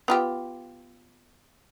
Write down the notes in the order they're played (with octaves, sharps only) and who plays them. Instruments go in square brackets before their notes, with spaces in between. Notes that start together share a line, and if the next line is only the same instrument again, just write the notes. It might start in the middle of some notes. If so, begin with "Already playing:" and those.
[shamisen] B3 F4 G4